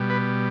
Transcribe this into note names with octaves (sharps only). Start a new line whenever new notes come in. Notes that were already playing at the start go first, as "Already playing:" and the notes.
Already playing: B2 G3
B4